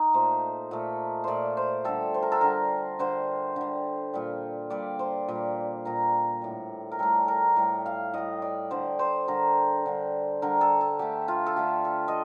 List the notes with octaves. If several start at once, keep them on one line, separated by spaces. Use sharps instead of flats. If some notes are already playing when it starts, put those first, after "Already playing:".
Already playing: D#4
A#2 A3 C5
A#2 A3
A#2 A3 C5 D5
C5
D3 G3 A4
C5
A#4
A4
D3 G3 A#4
D3 G3 C5
D3 G3
A#2 G3
A#2 G3 D5
C5
A#2 G3
A#2 G3 A#4
A2 G3
A#4
A2 G3 A4
A#4
A2 G3
F5
A2 G3 D#5
D5
D3 G3 C5
C5
D3 G3 A#4
D3 G3
D3 G3 A#4
A4
A4
D3 A3 G4
F4
A4
D3 A3 G4
A4
D#5